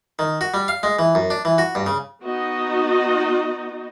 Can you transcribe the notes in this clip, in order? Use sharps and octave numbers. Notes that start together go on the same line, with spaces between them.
D#3
F#4
G3
F5
G#3
E3
F#2
D4
E3
F#4
G2
C#3
B3 D#4 F#4 D#5